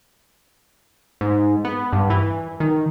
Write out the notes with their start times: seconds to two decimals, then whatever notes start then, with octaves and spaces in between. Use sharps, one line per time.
1.21 G#2
1.65 B3
1.93 G2
2.10 E3
2.60 D#3